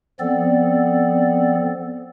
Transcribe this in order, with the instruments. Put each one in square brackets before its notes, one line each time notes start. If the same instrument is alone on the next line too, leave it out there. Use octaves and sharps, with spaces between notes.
[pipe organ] F3 B3 C4 A4 D5